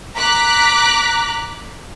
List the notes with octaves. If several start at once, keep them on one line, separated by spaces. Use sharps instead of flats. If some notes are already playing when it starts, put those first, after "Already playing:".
A#5 D6 F#6 B6